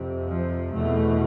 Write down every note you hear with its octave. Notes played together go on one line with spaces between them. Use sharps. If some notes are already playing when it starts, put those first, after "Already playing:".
Already playing: F2 C3
F3
E2 B2 A3